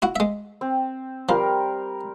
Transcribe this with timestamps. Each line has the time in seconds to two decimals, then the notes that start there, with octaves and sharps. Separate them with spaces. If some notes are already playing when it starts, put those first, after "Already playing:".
0.02 E4 F#4
0.16 G#3 E5
0.61 C4
1.29 F3 G3 A#4 C5